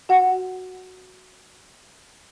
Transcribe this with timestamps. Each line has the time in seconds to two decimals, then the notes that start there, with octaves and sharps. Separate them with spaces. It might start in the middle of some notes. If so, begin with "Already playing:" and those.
0.09 F#4 F#5